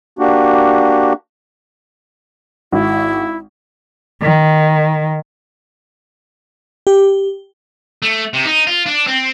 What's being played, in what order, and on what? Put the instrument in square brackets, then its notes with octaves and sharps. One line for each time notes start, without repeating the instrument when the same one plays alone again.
[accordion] A#3 D4 F#4 G4
[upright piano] G#1 [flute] E4
[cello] D#3
[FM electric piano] G4
[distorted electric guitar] A3
C3
D#4
F4
D4
C4